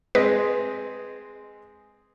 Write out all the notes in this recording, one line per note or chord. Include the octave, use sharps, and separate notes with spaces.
G#3 C4 B4 D#5